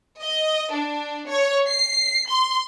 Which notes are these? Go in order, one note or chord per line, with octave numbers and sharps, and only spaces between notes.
D#5
D4
C#5
C7
C6